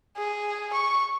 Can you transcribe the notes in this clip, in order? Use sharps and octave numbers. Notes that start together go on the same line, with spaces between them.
G#4
C#6